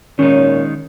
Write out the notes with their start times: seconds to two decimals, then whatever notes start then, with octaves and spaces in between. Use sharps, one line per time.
0.19 A#2 D#3 G#3 C#4 D#4 C#5